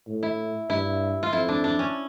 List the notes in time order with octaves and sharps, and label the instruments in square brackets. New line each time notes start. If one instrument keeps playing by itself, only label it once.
[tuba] A2
[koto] E4
[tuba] G2 [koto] E4
[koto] F4
[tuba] F2 [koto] E4
[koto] D4
D4
C#4